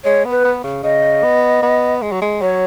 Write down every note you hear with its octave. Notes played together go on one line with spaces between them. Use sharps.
G#3 C#5
B3
B4
B3
C#3
C#3 D#5
B3
B3
G#3
F#3
G#3
F#3 C#5